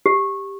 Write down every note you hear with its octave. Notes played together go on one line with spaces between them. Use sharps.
G4